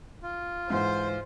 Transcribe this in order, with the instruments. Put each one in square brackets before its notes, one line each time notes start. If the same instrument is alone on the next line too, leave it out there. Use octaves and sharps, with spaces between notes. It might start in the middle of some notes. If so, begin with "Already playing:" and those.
[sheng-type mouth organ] F4
[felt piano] G#2 E3 [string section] C5